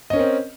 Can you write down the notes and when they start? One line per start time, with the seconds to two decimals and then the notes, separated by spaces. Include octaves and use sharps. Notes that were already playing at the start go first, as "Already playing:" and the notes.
0.10 D#5
0.13 C#4
0.16 A#4
0.19 C4